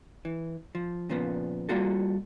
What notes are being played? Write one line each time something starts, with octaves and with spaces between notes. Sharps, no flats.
E3
F3
A#2 C#3 F3 B3
G3 A#3 F4 F#4 A4